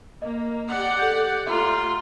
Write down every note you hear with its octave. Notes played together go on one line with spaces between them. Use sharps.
A#3 D#5
G4 D5 F#5
A4 G6
A3 F4 E5 A#5